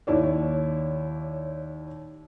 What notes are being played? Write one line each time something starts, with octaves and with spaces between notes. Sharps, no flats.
D#2 E4 C#5 D5